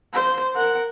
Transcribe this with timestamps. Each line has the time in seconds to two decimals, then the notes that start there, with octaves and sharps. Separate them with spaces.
0.14 C5
0.55 A#4 F#5